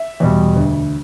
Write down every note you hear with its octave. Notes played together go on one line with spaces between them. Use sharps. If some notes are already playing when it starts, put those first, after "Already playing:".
Already playing: E5
E2 B2 G3
D2